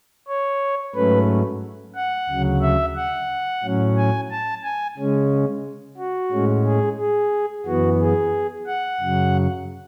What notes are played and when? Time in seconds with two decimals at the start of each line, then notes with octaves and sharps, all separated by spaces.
0.28 C#5
0.95 G#2 F#3 A3 C#4 B4
1.95 F#5
2.29 D2 C#3 F#3
2.62 E5
2.96 F#5
3.63 A2 F#3 C#4
3.97 G#5
4.30 A5
4.64 G#5
4.98 C#3 G#3 C#4
5.98 F#4
6.31 A2 G#3 C#4
6.65 G#4
6.98 G#4
7.66 F#2 E3 B3 F#4
8.00 G#4
8.67 F#5
9.00 F#2 C#3 F#3